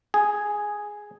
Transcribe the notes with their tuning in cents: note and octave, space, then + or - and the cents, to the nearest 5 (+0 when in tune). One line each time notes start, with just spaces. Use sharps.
G#4 +0 G#5 +0